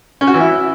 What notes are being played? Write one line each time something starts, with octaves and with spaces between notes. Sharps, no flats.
C#4
F#4
E3
E4